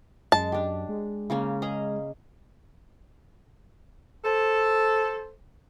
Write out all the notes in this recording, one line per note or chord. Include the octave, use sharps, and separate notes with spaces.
F#2 G#3 A5
D4 G4
G#3
C#3 A#3 C#4
G#4 D#5 A#5
A4 C5